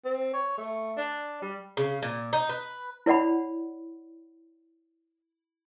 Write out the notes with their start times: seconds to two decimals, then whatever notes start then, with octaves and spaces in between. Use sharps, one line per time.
0.05 C4
0.33 C#5
0.58 A3
0.97 D4
1.42 G3
1.77 C#3
2.02 A#2
2.33 D#4
2.49 B4
3.06 E4 C#5 D5 F#5 B5